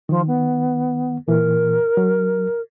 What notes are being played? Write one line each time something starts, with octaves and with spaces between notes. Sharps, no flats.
D#3 F3
B3
A#2 E3 A#4
F#3